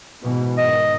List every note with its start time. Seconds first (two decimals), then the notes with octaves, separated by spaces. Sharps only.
0.23 G#2 B2 E3
0.58 G#2 D#3 D#5